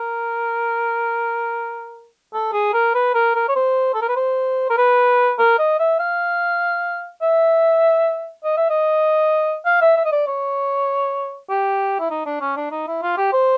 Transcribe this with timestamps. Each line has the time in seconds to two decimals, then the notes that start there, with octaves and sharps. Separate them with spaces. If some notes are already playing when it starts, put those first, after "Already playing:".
Already playing: A#4
2.33 A4
2.53 G#4
2.73 A#4
2.94 B4
3.14 A#4
3.35 A#4
3.48 C#5
3.55 C5
3.94 A4
4.02 A#4
4.08 B4
4.16 C5
4.70 A#4
4.77 B4
5.39 A#4
5.59 D#5
5.79 E5
5.99 F5
7.22 E5
8.44 D#5
8.57 E5
8.70 D#5
9.66 F5
9.81 E5
9.96 E5
10.05 D#5
10.12 D5
10.27 C#5
11.49 G4
11.99 E4
12.10 D#4
12.26 D4
12.41 C#4
12.56 D4
12.71 D#4
12.87 E4
13.02 F4
13.17 G4
13.33 C5